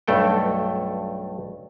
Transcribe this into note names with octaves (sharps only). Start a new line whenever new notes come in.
B1 G2 A3 A4 G5